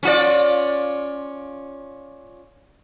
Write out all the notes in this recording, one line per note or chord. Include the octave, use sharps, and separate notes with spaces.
C#4 F4 D5